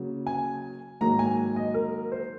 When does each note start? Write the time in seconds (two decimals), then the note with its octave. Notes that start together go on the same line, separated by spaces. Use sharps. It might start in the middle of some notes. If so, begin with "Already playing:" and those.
Already playing: C#3 F#3 A#3
0.27 G#5
1.01 G#2 D#3 F#3 A#3 A#5
1.19 G#5
1.56 D#5
1.74 A#4
2.12 C5